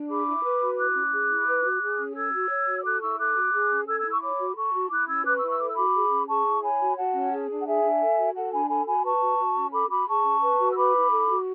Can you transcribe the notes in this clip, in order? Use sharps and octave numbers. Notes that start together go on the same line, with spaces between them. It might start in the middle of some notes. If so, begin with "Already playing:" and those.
Already playing: D4
G#4 B5 D6
E4
B4
F#4
E4 D6 F#6
C#4
G#4
E4
B4
F#4
G#4
C#4
A4 E6 G#6
F#4
C#5
F#4
E6
A4 D6 F#6
E4 C#6 E6
A4 D6 F#6
F#4
G#4
C#4
A4 E6 G#6
E6 G#6
E4
C#6 E6
C#5 B5 D6
F#4
A4 A5 C#6
F#4
E4 D6 F#6
C#4 E6 G#6
B4 D6 F#6
C#6 E6
E4
C#6 E6
A4 D6
E6
F#4 B5 D6
G#4
C#4
G#4 A5 C#6
E4
C#5 G#5 B5
F#4
F#4 F#5 A5
C#4
G#4
D4
F#5
G#4 E5 G#5
D4
A4
F#4
A4 F#5 A5
D4 G#5 B5
A4 G#5 B5
F#4 G#5 B5
B4 A5 C#6
F#4
F#4
C#4
A4 B5 D6
F#4 B5 D6
G#4 A5 C#6
C#4
B4
F#4
E6
B4 B5 D6
E4
A4
F#4